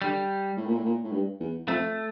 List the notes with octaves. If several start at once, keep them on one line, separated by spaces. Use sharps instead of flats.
D3 G3
A2
A#2
A2
A#2
A2
G2
E2
F2 A3